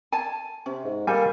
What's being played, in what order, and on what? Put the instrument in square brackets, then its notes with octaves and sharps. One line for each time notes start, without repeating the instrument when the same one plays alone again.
[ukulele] G#5 A5
[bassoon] C3 [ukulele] C#4
[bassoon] G#2
[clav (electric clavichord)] G3 A4 [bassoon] A#3 [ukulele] G#5